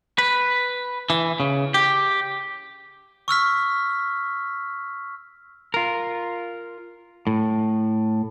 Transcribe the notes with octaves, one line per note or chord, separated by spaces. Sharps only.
B4
E3
C#3
G4
C#6 E6 F6 B6
F4 A#4
A2